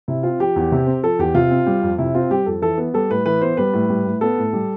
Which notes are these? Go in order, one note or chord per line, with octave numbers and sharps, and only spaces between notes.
C3 E4
C4 F4
F3 G4
E2
C3
C4
F3 A4
E2 G4
C3 F4
C4
G3
F2
C3 E4
C4 F4
G3 G4
F2 A4
E3 A4
B3
G3 A4
A2 B4
E3 B4
B3 C5
G3 B4
A2
G3
A2
B3 A4
A2
G3